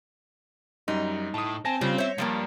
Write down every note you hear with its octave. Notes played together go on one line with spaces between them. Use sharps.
F#2 G3 D#4
A2 A5 D#6
C4 G#5 A5 A#6
C#3 G3 C4 C#4 F4
C5 C#5 E5
G2 F3 G3 A#3